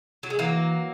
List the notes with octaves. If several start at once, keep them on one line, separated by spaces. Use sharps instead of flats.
F#3
G#3
E3 F#3 A#3